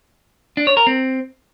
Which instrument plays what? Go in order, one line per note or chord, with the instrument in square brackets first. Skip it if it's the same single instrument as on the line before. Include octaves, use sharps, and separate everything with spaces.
[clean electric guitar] D4
C#5
A#4
C4